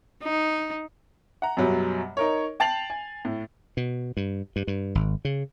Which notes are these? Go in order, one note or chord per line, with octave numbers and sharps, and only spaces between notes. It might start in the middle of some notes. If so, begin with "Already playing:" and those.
D#4
F#5 A#5
F#2 B2 F#3 G3
D#4 A#4 C#5
G5 A5 A6 C7 F7 F#7
G#5
A2
B2
G2
G2
G2
G#1
C#3